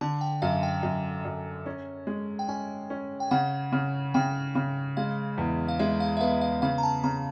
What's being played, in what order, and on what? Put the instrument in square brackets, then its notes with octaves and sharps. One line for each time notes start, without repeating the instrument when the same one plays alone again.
[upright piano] D3 [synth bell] A5
[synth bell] G5
[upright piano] F#2 [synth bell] F5
[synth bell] G5
[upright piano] F#2
F#2
C#4
G#3
[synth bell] G5
[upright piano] C#4 [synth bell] G#5
[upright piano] C#4
[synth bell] G5
[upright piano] C#3 [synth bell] F#5
[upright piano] C#3
[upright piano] C#3 [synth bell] G5
[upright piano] C#3
[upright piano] G#3 [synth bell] F5
[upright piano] E2
[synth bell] F5
[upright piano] G#3 [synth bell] E5
[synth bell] F5
E5
[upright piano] B3 [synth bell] F5
[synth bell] F5
[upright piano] C#3 [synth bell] F5
[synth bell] A#5
A5
[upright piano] C#3 [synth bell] A#5